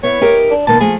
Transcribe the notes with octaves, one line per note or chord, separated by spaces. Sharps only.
B3 E4 C#5
D#4 G4 A#4
D4
B2 D#3 A#3 A5
F3 A3 G#4